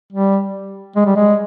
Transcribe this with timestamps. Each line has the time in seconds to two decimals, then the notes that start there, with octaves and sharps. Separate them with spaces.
0.12 G3
0.96 G#3
1.06 G3
1.16 G#3